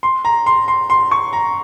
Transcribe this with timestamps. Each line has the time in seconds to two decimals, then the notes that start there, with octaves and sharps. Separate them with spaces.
0.03 C6
0.25 A#5
0.46 C6
0.68 C6
0.90 C6
1.11 C#6
1.33 A#5